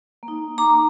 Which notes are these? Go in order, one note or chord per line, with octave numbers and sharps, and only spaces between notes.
A#3
D#4
A#5 D6